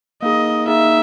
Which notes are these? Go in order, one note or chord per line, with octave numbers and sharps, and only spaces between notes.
A#3 D#4 G#4 D#5
A#3 D#4 G#4 E5